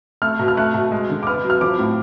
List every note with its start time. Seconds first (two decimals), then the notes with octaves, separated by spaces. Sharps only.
0.22 A3 F6
0.39 B2
0.48 F6
0.57 A3 F#6
0.74 B2
0.91 G#3
1.10 D3
1.23 D6
1.27 B3 F6
1.44 F#3
1.50 F6
1.61 F3 D6
1.79 A2